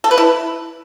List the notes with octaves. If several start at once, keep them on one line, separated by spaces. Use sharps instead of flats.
A4
B4
E4